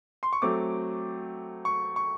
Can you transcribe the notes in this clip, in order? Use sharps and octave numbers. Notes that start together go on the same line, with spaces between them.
C6
C#6
F#3 A3 C4 D6
C#6
C#6